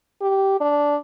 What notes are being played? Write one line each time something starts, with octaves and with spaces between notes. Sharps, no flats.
G4
D4